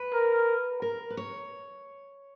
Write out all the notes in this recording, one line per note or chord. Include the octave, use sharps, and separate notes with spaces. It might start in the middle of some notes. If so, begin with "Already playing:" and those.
Already playing: B4
A#4
A#4
B4
C#5